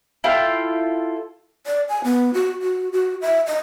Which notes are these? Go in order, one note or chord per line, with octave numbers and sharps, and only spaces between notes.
E4 F4 A4 G5
D5
G#5
B3
F#4
F#4
F#4
E5
D#5